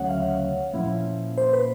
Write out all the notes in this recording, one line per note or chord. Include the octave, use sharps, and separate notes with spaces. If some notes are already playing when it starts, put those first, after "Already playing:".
Already playing: D2 C#3 F#3 A3 C#5 E5 F#5
F5
A#2 F3 A#3 C#4 E4
C5
B4